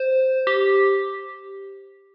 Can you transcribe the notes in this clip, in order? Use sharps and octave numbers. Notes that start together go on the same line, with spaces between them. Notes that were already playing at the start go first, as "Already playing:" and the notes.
Already playing: C5
G4